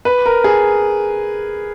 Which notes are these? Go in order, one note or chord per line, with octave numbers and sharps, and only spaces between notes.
B4
A#4
G#4